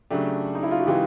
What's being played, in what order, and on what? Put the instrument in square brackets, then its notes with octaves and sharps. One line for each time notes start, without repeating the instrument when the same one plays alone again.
[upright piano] C#3 F#3 A3 D4 G4
[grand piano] D#4
E4
F4
F#4
[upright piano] C#3 E3 G#3 [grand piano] F4 G4